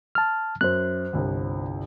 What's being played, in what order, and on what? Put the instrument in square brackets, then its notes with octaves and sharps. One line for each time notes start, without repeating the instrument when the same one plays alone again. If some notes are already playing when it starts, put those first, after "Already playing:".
[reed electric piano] A5 F6
[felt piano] F#2 [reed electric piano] C5 F#6
[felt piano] G1 C2